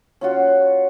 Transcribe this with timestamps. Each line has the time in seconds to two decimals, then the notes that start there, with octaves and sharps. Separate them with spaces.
0.21 C#4 F4 F#4